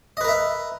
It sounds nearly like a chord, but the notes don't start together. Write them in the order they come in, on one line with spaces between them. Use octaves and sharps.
D#5 B4 A#4 E5